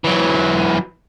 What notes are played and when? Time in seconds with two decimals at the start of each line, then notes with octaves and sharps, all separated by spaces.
0.04 E3 F#3